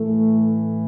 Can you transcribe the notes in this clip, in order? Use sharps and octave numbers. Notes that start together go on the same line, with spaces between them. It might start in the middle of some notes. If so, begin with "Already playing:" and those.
Already playing: A2 E3 A3